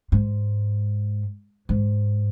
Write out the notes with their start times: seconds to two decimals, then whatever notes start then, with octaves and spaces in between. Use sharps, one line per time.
0.12 G#2
1.69 G#2